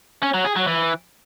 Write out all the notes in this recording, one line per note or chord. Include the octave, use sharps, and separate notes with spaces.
C#4
F#3
G#4
F#3
E3